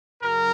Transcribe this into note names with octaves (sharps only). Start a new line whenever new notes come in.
F#2 C#3 F#3 A#4